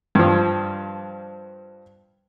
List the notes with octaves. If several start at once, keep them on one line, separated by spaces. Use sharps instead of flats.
G2 F3